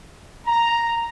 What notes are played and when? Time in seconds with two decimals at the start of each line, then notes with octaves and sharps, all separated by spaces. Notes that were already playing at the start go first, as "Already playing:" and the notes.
0.47 A#5